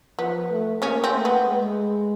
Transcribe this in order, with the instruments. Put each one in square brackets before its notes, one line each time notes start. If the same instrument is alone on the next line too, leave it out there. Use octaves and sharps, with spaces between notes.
[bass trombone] F3 [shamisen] B3
[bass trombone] A3
[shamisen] C#3 C#4 [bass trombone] A#3
[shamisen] C4
[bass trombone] A3
[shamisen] B3
[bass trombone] G#3